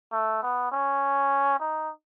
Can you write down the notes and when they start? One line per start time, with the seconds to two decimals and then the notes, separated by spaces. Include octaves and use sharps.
0.12 A3
0.43 B3
0.72 C#4
1.59 D#4